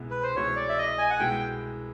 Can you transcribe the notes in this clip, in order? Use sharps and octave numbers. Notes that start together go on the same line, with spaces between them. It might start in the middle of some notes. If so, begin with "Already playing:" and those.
Already playing: C2 B2 G#3 B3 E4
B4
C5
C2 B2 G#3 B3 E4 C#5
D5
E5
D#5
G#5
F#5
C2 B2 G#3 B3 E4 G5